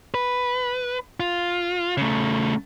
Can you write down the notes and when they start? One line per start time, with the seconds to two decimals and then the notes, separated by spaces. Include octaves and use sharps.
0.14 B4
1.20 F4
1.97 C#3 A3